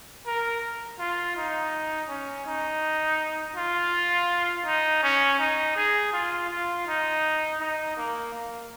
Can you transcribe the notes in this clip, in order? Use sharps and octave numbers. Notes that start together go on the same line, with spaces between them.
A#4
F4
D#4
C#4
D#4
F4
D#4
C#4
D#4
G#4
F4
F4
D#4
D#4
A#3
A#3